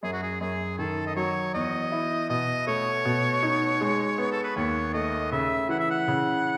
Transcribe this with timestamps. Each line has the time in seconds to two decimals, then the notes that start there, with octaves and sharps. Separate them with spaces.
0.03 F#2 G#4
0.12 F#4
0.22 G#4
0.41 F#2 G#4
0.78 D#3 A4
1.06 D#5
1.16 F#3 C#5
1.54 E2 D#5
1.92 E4
2.29 B2 D#5
2.67 A3 C#5
3.05 B2
3.43 D#4
3.81 G#3
4.18 B3
4.32 A4
4.43 B4
4.56 D#2 C#5
4.94 A3 D#5
5.32 C#3 E5
5.69 E3 F#5
5.80 E5
5.91 F#5
6.08 C#3